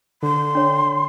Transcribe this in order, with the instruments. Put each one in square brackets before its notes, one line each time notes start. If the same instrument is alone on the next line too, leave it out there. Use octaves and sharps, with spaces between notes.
[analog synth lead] D3 [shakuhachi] C6
[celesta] D4 C#5